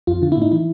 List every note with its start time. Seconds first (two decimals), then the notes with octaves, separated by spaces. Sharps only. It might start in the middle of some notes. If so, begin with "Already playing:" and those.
0.07 F2 F4
0.22 D3 F4
0.32 E4
0.37 A2 D#4
0.52 E3 E4